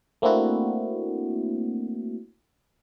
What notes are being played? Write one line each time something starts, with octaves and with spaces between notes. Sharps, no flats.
A3 A#3 C4 D4 E4 F#4